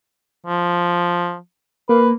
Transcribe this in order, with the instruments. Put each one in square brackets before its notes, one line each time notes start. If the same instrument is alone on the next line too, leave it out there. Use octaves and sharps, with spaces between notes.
[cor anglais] F3
[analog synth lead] A#3 [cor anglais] B4